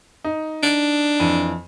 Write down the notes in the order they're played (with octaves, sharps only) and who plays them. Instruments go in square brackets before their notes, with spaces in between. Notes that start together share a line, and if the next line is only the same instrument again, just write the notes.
[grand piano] D#4
[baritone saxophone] D4
[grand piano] F2 E3 D#7